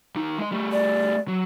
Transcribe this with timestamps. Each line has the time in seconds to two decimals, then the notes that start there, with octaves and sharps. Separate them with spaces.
0.15 D#2 D#4
0.38 G#3 D#5
0.52 G3 A3
0.72 D5
1.28 F#3